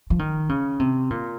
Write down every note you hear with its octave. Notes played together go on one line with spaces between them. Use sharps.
F3
D#3
C#3
C3
A#2